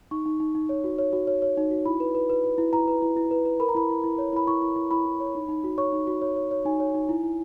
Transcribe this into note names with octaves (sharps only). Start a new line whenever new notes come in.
D#4 C#6
D#4
D#4
D#4
C#5
F#4
C#5
F#4
C#5
C#5
D#4
F#4
E4 B5
B4
B4
B4
B4
E4
E4 A#5
B4
E4
E4
B4
B4
A#4 B5
A#5
E4 B5
E4
E4
C#5
E4 B5
E4 C#6
E4
E4
E4 B5
E4
C#5
D#4
D#4
F#4
C#5 C#6
D#4
F#4
C#5
C#5
C#5
D#4 G#5
C#5
D#4
E4
E4